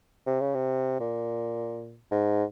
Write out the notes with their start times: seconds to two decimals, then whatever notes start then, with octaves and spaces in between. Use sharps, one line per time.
0.26 C3
0.41 C#3
0.55 C3
1.00 A#2
2.11 G#2